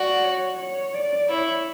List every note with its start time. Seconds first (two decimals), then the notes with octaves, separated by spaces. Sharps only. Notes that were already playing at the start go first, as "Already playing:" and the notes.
Already playing: F#4 D5
0.24 C#5
0.58 C#5
0.95 D5
1.29 E4 C#5